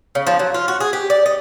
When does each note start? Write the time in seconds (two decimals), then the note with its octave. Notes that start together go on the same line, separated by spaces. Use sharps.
0.15 C#3
0.27 F3
0.39 F#3
0.54 F4
0.68 F#4
0.80 G#4
0.93 G4
1.10 D5
1.26 D#5